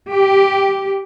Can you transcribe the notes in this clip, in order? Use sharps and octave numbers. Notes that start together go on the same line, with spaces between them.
G4